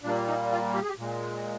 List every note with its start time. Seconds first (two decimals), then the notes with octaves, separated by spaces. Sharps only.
0.03 A#2 G3 A#3 D4
0.28 D#4
0.52 F4
0.74 G4
0.82 G#4
0.89 G4
0.98 A#2 G#3